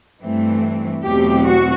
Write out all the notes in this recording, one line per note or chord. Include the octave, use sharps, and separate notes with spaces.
G2 E3 A3 C4
E2 B2 F#3 A3 C4 G4
F#4